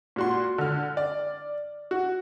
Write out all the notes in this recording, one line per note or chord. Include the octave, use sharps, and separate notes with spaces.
A#2 F#4 C6
D3 F6
D5
F#4